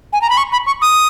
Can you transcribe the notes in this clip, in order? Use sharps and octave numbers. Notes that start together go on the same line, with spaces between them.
G#5
A#5
B5
C#6
B5
C#6
D#6